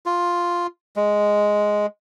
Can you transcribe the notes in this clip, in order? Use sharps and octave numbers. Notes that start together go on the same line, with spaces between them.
F4
G#3